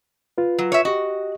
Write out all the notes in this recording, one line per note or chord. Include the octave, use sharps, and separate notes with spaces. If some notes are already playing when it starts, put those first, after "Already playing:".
F4 B4
F#3
C#5 E5
F#4 G4 D#5